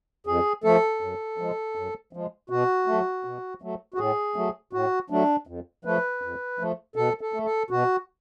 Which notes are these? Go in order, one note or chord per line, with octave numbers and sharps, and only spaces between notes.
F2 G#4
F3 A3 A4
F#2
F3 G#3
F#2
F3 G#3
B2 F#4
F#3 A3
B2
F#3 A3
F#4
A2 G#4
F#3 A3
A2 F#4
F#3 A3 D4
F2
F3 A3 B4
F2
F3 A3
B2 A4
A4
A3
A4
B2 F#4